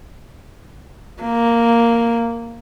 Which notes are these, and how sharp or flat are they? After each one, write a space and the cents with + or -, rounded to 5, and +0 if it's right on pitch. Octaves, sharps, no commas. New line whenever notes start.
A#3 -5